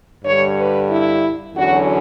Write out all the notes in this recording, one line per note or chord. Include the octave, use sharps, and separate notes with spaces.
G2 D3 G3 C#5
B4
E4
E2 D3 F#3 C#4 F#4